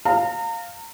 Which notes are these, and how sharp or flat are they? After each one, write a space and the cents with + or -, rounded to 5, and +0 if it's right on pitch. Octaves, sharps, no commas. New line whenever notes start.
F5 +0 A#5 -35